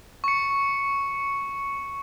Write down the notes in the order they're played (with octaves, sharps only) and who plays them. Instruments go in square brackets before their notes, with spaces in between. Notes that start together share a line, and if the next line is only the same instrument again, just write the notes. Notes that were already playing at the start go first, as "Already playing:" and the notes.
[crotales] C#6 C#7